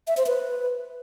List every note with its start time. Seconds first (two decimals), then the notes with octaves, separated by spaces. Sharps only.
0.07 E5
0.17 C5
0.27 B4